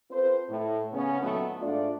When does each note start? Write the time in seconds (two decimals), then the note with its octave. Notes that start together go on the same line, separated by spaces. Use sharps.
0.11 C4 F4 A4 B4 C5
0.49 A2
0.92 C#3 B3 C#4
1.22 A#2 D#3 F#3 A3 B3
1.61 G#2 A3 D4 F4 D5